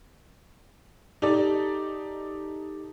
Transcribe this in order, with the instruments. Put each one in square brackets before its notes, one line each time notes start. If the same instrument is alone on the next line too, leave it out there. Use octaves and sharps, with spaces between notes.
[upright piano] D#4 G4 A4 D5